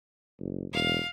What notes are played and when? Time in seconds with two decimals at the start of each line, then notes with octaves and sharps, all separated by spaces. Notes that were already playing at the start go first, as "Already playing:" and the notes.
0.40 F#1
0.73 E1 F5